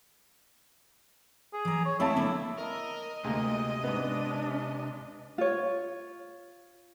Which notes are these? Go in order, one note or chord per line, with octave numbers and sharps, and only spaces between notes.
G#4
E3 A#5
C#5
G#3 C4 E4 C#5 F5 A5 B5
D3 A#3 D4
A#4 D#5
D2 C3 G#3 A#3
G#2 B3 D4
F4 C#5